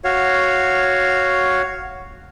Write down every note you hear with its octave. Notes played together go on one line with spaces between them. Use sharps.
F#4 C#5 F5